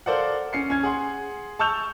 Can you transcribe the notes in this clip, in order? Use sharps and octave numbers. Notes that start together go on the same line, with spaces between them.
A4 A#4 C5 D5 F5 F#5
C#4 C7 C#7
C#4 G#6
G#4 F#5 C6
A5 C#6 E6 G6 F7